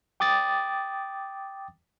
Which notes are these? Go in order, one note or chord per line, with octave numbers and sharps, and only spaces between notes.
G5 D6 D#6 A6